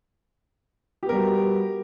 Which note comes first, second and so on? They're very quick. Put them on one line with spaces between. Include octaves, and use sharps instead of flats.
G4 B3 A#4 G3 F#4